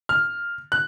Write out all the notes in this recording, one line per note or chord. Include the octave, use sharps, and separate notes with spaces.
F6
F#6